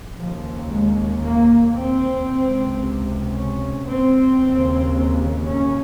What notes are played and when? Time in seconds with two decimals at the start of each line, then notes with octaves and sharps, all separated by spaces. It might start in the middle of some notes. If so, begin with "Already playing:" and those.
0.15 D#2 C#3 F3
0.68 G#3
1.21 A#3
1.74 C4
2.27 C#2 C3
3.33 C#4
3.87 C4
4.40 D#2 C#3
5.46 C#4